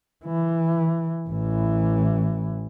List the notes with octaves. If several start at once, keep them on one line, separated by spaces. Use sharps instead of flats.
E3
A1 E3